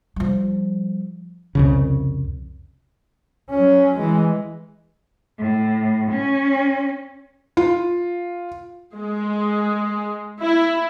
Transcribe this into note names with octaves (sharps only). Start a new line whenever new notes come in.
F3 G3
C2 F2 C#3
F#3 C#4
E3 G#3
A2
C#4
F4
G#3
E4